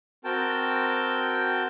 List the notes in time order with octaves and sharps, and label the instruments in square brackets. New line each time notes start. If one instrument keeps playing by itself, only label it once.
[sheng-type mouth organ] C4 F#4 A#4 G5 A5